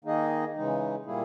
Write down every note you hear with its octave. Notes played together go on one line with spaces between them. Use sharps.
D#3 A#3 D#4 G#4 D#5
C#3 E3 G#3 D#4
A#2 G3 A#3 E4 G#4